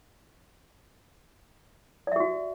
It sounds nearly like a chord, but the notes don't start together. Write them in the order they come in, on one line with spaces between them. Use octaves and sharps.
D5 E5 G4 F#4